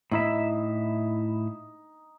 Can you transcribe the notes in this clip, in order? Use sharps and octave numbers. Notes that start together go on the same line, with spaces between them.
A2 D#4 E4 E5